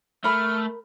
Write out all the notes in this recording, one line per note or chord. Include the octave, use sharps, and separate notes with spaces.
A3 A#4 B5 F6